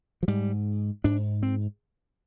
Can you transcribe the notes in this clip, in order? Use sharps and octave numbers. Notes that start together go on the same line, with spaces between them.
F3
G#2 G3
G#2 D4
C4